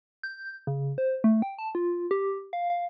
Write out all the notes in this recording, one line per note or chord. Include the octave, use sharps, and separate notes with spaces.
G6
C#3
C5
A3
G5
A5
F4
G4
F5
F5